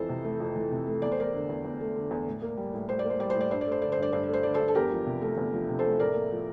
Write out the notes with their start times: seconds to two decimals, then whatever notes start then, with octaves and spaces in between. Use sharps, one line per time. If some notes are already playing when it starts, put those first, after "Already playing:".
Already playing: F2 E3 A4 C5
0.09 C3
0.24 A3
0.40 F2
0.56 E3
0.71 C3
0.87 A3
1.02 E2 D5
1.12 C5
1.18 A3 A#4 D5
1.33 D3
1.49 E2
1.65 E2
1.81 A3
1.96 D3
2.11 E2
2.27 A2
2.42 A#3
2.57 G3
2.73 A2
2.88 A2 C5
2.99 D5
3.05 A#3
3.10 C5
3.20 G3 D5
3.30 C5
3.35 A2
3.41 D5
3.51 G2 C5
3.61 D5
3.66 A3
3.72 C5
3.82 D3 D5
3.92 C5
3.97 G2
4.02 D5
4.12 G2 C5
4.24 D5
4.29 A3 C5
4.43 D3 D5
4.54 A4 C5
4.60 G2
4.68 A4
4.75 E2 G4 A#4
4.91 F3
5.06 C3
5.22 A3
5.38 E2
5.54 F3
5.69 C3
5.79 A4 C5
5.84 A3
6.00 A2 A#4 D5
6.15 A#3
6.31 F3